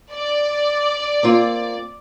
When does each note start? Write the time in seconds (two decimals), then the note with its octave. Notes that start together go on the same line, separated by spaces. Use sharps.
0.12 D5
1.23 A#3 C4 F4